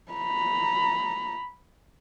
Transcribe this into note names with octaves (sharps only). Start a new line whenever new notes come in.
A#5 B5